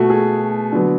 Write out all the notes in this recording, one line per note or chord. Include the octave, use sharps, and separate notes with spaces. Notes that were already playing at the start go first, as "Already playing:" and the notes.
Already playing: B2 A3 F#4
G#4
D3 F#3 B3